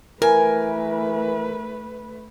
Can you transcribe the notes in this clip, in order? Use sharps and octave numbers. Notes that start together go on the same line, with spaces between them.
E3 A3 A#4 B4 G#5